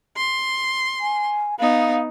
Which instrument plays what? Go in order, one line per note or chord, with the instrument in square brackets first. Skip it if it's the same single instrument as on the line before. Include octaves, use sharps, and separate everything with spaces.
[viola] C6
[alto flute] G#5
[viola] B3 D#4 [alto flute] F5